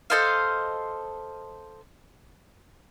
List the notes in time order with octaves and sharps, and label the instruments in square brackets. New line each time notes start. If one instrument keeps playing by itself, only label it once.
[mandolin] A4 C5 D#5 F5